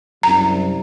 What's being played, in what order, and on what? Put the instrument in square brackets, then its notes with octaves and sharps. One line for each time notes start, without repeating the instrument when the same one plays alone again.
[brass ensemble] C2 F#2 [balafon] A#5